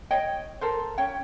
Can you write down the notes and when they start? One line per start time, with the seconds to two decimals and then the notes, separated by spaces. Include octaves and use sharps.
0.11 C#5 D#5 G5
0.61 A4 A#4 C5
0.98 C#4 C#5 G5